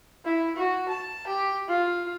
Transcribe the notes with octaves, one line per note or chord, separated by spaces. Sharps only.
E4
F#4
A5
G4
F4